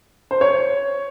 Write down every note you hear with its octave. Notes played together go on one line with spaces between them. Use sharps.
C5
C#5